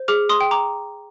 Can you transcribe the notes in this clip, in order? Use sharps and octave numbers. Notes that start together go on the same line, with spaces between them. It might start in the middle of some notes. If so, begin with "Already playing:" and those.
Already playing: C5
G#4 D6 F6
C6 D#6
G5
A#5 D6